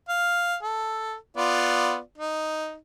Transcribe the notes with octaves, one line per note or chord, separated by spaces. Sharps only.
F5
A4
B3 F4 D5
D#4